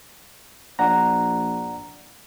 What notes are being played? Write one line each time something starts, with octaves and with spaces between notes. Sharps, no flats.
A#1 D5 F#5 A#5